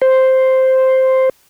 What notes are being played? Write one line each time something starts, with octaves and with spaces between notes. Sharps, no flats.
C5